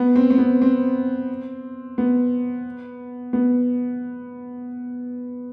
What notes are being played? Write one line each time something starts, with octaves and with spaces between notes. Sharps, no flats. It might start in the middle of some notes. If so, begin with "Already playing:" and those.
Already playing: B3
C4
C4
B3
C4
B3
B3